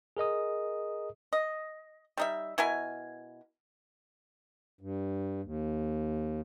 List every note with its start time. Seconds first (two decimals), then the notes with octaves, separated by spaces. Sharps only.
0.17 G#4 A#4 D#5 D#6
1.33 D#5
2.17 G3 D#4 E5
2.58 B2 E4 A#4 G#5
4.81 G2
5.43 D#2